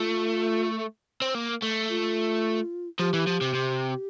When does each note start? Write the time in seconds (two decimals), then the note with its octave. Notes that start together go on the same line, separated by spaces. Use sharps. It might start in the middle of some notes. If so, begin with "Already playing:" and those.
Already playing: A3 F4
1.22 C4
1.35 A#3
1.62 A3
1.89 F4
2.99 F3 G4
3.14 E3
3.27 F3
3.42 C3
3.55 C3